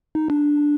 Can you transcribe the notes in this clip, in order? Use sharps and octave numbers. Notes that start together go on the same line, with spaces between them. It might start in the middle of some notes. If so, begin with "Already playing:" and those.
D#4
D4